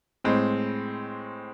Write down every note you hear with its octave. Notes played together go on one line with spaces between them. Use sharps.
A2 G#3 C4